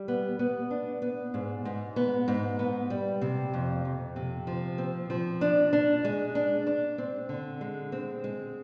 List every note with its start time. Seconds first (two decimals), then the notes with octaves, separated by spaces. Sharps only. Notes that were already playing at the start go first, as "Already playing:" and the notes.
Already playing: G3
0.08 B3
0.39 B3
0.71 D4
1.02 B3
1.34 G#2
1.65 G#2
1.96 B3
2.28 G#2
2.59 B3
2.90 G3
3.22 C3
3.54 F2
3.85 F2
4.16 C3
4.47 F3
4.78 C4
5.10 F3
5.41 D4
5.73 D4
6.04 G#3
6.35 D4
6.67 D4
6.98 C4
7.29 D3
7.61 G#3
7.92 C4
8.24 G#3